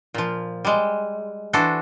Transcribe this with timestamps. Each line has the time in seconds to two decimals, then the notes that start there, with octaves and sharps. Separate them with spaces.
0.14 A#2 F3
0.65 G3 G#3
1.53 E3 D4 F#4 A4 C5